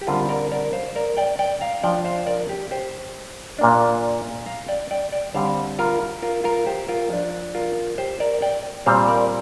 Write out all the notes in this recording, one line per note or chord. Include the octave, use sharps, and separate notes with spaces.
G4
D3 G3 C4 F4 A#4
A#4 D5
A#4 D5
C5 F5
A#4 D5
D5 G5
D5 G5
F5 A#5
F3 D4 D5 G5
C5 F5
A#4 D5
G4
G4 C5
A#2 A#3 D4
F5 A#5
D5 G5
D5 G5
D5 G5
D3 G3 C4 C5 F5
F4 A#4
F4 A#4
F4 A#4
G4 C5
F4 A#4
F3 D4
F4 A#4
G4 C5
A#4 D5
D5 G5
A#2 G3 C4 C5 F5
A#4 D5